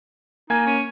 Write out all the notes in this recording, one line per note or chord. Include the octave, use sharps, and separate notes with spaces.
A#3 D#4 G#5 G#6
C#4